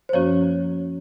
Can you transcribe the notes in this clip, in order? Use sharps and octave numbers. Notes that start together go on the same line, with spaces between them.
C5
F#2 F3 A#3 C#4 F#4 C#5